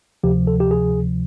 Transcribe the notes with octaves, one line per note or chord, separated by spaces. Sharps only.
D2 C3 F3 G4
A4
G4
G#4